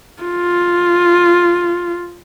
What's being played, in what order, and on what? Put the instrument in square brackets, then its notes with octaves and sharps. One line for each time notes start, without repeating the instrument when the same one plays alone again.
[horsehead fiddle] F4